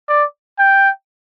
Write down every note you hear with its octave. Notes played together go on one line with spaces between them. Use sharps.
D5
G5